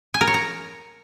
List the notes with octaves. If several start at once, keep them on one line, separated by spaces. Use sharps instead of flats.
G#5
A#4
C#5
A#5